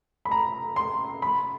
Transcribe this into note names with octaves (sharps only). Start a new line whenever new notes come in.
B5
A#5
C6
B5